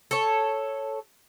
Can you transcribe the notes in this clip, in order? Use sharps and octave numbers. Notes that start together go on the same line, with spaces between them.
A4 C#5